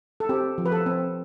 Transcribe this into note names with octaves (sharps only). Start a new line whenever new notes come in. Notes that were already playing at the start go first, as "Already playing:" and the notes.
A4
C4 G4
F3
B4
A4
C4